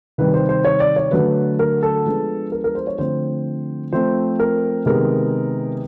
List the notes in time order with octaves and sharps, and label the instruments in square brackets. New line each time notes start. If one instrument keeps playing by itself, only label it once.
[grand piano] C3 D#3 G3 B4
C5
C5
C#5
D5
C#5
D3 F#3 A3 B4
A#4
A4
F3 G#3 B3 D4
A#4
A#4
C5
C#5
D3 F3 A3 C4 C5
F3 A3 C4 C5
A#4
C3 D#3 G#3 B3 A#4